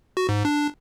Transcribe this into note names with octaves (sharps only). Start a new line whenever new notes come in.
F#4
G#2
D4